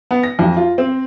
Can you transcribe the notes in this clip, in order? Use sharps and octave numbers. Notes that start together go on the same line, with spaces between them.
B3
A#6
F2
F4
C4